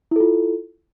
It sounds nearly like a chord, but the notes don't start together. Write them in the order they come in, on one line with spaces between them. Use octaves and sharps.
E4 A4 F4